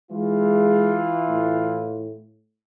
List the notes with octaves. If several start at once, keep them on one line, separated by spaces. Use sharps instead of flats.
E3 G#3 F4
A2